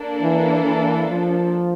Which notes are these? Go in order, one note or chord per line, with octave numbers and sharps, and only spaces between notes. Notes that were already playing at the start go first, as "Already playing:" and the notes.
Already playing: A#3 D4 A4
E3
E3
F3